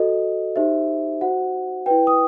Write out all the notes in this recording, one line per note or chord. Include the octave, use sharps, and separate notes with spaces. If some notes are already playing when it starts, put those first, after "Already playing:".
Already playing: F#4 A4 C5 D#5
D#4 G4 C5 E5
F#4 C5 F#5
E4 B4 G5
D#6